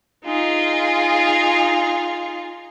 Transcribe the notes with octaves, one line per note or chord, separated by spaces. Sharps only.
D#4 F4 G#4